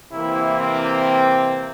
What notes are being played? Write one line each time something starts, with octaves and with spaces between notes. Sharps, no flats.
C3 E3 A#3 E4
C4